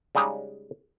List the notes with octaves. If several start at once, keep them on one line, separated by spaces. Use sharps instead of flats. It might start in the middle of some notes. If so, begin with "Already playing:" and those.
C#3 G3 G#3 D#4 G4